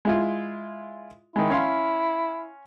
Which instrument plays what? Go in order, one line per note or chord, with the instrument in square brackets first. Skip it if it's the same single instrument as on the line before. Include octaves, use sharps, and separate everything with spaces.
[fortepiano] G#3 E4 F4
[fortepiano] D#3 G#3 [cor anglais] E4
[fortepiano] C#4 F5 C6